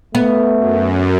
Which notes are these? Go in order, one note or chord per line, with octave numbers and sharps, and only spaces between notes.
A3 B3
F#2